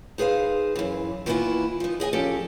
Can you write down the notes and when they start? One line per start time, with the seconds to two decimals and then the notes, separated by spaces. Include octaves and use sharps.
0.18 D#4 G#4 B4 C5 F5
0.76 F#2 E3
1.26 D#3 E3 A#3 B3 E4 F4
1.80 F3 D#4
2.00 G#4 D#5 E5 G#5
2.13 F3 C#4 G4 A4 D5